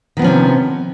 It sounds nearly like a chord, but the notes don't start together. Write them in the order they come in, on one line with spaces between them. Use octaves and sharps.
D#3 B3 F3 C#4 C3